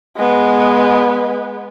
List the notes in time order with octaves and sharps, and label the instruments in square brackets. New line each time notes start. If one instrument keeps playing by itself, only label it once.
[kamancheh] G#3 B3